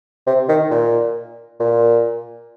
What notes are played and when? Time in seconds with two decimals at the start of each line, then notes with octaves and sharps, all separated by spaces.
0.27 C3
0.49 D#3
0.71 A#2
1.60 A#2